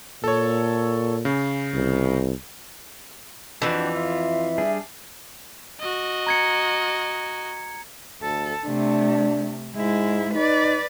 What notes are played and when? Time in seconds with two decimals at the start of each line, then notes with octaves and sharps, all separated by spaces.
0.24 A#2 A4 C#5
1.25 C#3
1.75 C2
3.62 F2 E3 D4 F#4 G4
3.95 F4 E5
4.58 G3 D4 G#4
5.80 F#4 D#5
6.27 A#5 G#6 C#7
8.22 D2 A4
8.66 C3 A3 D4
9.76 G#2 G#3 E4
10.34 D#4 B4 D5